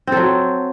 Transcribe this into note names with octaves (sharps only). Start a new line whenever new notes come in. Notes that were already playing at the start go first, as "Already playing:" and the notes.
F#3 C4 A4